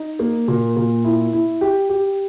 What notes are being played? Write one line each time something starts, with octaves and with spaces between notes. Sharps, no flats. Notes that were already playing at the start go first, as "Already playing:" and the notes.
Already playing: D#4
A#3
A#2
A#2
E4
E4
G4
G4